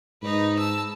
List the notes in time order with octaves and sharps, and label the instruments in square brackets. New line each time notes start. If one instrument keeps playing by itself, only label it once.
[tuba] G#2 [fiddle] D#4 B4
[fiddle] A5 E6